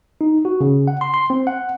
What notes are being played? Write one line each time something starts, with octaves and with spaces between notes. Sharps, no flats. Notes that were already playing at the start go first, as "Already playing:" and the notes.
D#4
F#4
C#3
F#5
C6
C6
C4
F#5